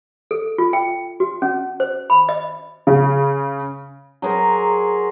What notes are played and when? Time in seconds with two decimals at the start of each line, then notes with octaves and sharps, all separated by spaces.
0.31 A4
0.58 F4
0.73 G5
1.20 F#4
1.42 C#4
1.80 C5
2.10 B5
2.29 D#5
2.87 C#3
4.22 F#3 G#4 A#4 C5